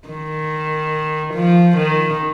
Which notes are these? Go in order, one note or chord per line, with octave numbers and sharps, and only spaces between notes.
D#3
F3
D#3